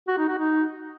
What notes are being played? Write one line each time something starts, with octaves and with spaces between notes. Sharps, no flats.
F#4
D#4
F#4
D#4